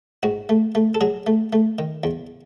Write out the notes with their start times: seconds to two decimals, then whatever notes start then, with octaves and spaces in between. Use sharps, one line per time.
0.23 G#2 F#4
0.49 A3
0.75 A3
0.95 A4
1.01 F#3 G#4
1.27 A3
1.53 A3
1.79 D#3
2.04 E2